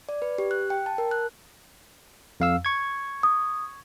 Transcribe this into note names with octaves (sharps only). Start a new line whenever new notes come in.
D5
B4
G4
F#6
G5
A5
A#4
F#6
F2 F5 E6
C#6 G#6
D#6